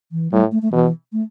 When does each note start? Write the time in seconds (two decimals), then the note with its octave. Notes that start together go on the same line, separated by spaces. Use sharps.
0.12 E3
0.32 A2 G3
0.52 A3
0.62 A3
0.73 B2 E3
1.13 A3